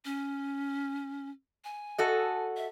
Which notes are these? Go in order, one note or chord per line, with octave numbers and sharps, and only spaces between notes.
C#4
G#5
F#4 A4 D#5
E5